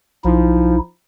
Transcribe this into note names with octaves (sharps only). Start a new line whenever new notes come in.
B1 F3 D#4 E4